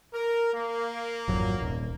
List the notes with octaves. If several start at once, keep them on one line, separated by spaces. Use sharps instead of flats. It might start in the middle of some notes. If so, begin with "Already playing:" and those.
A#4
A#3
G#1 F2 F#3
D#1